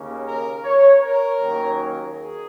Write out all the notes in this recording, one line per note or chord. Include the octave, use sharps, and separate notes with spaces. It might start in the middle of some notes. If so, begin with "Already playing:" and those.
Already playing: D#2 C#3 A#3 C#4
A#4
C#5
A#4
D#2 D#3 F#3 A#3 C#4
G#4